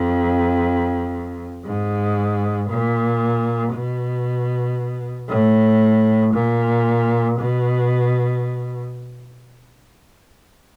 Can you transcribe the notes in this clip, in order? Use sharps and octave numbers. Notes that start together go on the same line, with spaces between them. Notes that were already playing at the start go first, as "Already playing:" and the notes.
Already playing: F2
G#2
A#2
B2
A2
A#2
B2